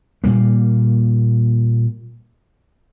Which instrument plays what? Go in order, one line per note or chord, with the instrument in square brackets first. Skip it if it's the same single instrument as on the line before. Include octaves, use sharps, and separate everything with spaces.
[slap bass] A#2 G3 A#3